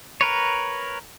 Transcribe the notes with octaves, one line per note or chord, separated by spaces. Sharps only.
A#4 B4 C#5